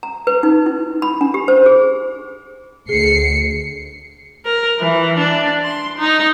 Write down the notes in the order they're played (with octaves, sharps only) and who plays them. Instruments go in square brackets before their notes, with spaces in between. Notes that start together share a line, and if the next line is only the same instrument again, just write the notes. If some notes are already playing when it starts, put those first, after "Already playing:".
[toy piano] A#5
B4
D#4
E4
B5
D4
G4
C5
G#4
[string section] D2 C7 C#7 [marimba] G#4
[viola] A#4
E3
D4
C6
D#4